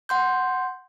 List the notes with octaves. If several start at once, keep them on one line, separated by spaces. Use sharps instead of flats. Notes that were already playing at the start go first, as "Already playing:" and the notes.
F#5 C6 G6